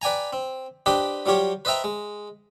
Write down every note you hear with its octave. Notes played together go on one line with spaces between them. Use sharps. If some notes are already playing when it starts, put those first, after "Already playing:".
B4 D5 G5 G#5 A#5
C4
D4 G4 B4 C5 D#5 G5
F#3 G3 F4 G4 C#5
B4 C5 D#5 E5 G5 A#5
G#3